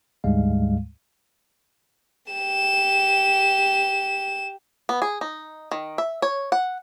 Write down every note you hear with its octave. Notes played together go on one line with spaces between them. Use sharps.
D2 G#2 G3 G#3 F5
G4 E7
B3
G#4
D#4
D#3
E5
C#5
F#5